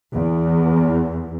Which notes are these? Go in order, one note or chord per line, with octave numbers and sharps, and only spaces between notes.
E2